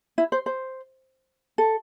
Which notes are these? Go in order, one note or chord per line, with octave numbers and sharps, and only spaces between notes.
E4
C5
C5
A4